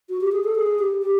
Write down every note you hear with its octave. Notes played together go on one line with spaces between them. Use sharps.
F#4
G4
G#4
A4
G#4
G4
G4